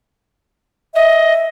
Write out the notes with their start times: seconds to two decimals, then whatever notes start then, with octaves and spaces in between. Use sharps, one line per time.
0.95 D#5 E5